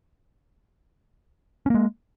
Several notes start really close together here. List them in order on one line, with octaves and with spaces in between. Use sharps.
C#4 A#3 G#3